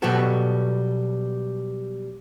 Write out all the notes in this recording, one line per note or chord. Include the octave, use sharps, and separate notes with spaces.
B2 F#3 G3 B3 F#4 A4